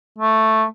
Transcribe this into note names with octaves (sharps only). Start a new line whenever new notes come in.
A3